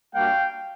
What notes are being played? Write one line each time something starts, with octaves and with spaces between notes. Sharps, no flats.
G3 A#3 D4 F#4 F5 G5